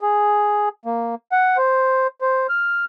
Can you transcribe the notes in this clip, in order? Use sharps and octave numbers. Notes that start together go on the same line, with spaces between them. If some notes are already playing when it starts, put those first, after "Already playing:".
G#4
A#3
F#5
C5
C5
F6